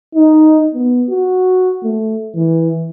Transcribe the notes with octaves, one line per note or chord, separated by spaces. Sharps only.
D#4
B3
F#4
A3
E3